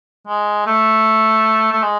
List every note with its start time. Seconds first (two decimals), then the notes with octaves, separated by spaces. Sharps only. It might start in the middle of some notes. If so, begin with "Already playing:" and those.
0.27 G#3
0.67 A3
1.72 A3
1.83 G#3